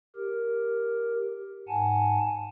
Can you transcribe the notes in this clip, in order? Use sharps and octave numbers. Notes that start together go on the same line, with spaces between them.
G4 A#4
G#2 F#5 G#5 A5